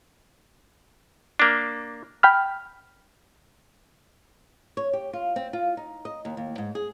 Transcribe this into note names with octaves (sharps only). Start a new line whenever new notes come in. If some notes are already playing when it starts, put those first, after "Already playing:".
A#3 D4
G5 B5 F6
C#5
G4
F4
C4
F4
D#4
D#5
D#2
D#2
G#2
G#4